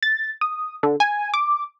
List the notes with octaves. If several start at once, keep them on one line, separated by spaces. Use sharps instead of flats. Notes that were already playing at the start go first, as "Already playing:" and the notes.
A6
D#6
D3
G#5
D6